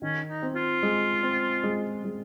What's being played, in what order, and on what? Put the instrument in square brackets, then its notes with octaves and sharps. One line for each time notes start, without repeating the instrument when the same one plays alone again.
[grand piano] D#3 [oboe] C#4
[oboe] D#4
[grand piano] C4
[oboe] F4
[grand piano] G#3
C4
G#3
G#3